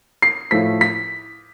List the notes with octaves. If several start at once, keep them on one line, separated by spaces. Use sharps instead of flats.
C7
A2 F3 A3 B6
B6